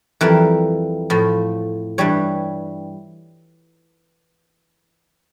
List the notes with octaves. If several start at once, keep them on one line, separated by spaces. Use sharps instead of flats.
F2 E3 G3 A#4
A2 F3
G2 E3 G3 C#5